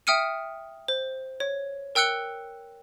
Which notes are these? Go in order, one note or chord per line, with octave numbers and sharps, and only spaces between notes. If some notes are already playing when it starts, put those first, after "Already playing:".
E5 G5 D#6 F6 C#7 D#7
C5
C#5
A#4 G5 E6 F#6 C#7 G7